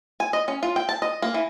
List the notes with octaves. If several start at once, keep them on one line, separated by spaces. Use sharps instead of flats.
G#5
D#5
C#4
F4
G5
A5
D#5
A#3
E3